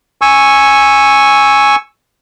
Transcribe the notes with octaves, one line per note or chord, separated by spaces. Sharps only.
G#5 C#6 E6